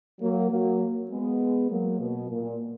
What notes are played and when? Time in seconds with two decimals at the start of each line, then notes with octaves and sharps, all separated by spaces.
0.21 F#3 A#3
0.51 F#3 A#3
1.10 G#3 B3
1.70 F#3 A#3
2.00 B2
2.31 A#2